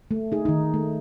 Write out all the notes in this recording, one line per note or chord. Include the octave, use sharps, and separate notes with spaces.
A3
D#4 G#4
D#3 D#4
A3